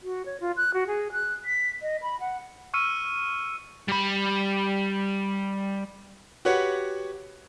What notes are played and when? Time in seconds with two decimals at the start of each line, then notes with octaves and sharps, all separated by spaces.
0.03 F#4
0.26 C#5
0.40 F4
0.57 F#6
0.74 F#4
0.87 G#4
1.12 F#6
1.45 B6
1.82 D#5
2.02 B5
2.20 F#5
2.74 C#6 E6 F6 C#7 D#7
3.88 G3 B5
6.45 F#4 G4 B4 C#5 F#5